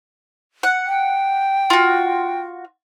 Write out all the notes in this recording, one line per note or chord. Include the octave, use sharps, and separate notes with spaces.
F#5
G5
F4 F#4